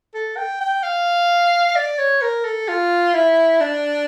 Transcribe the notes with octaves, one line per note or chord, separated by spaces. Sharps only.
A4
G5
G5
F5
D5
C#5
A#4
A4
F4
E4
D4